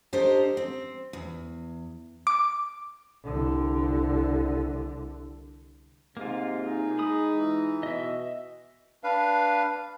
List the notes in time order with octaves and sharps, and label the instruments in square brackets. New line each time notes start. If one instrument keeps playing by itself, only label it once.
[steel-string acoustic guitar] D4 G4 A4 A#4 C5 D#5
C4
E2
[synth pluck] D6
[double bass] C2 D3
[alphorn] G#2 [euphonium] C3 [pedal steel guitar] A#3 F4
[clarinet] D#4 [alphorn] G#4
[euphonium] G#3 [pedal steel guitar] B5 D#6
[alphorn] E3
[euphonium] B2 [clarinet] F#4 [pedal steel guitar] D#5 E5
[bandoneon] D4 B4 F5